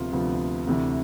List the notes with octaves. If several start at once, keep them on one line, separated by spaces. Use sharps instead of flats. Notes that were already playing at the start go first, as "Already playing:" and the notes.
Already playing: D2 C3 F3 B3 F4
D2 C3 F3 B3 F4
D2 C3 E3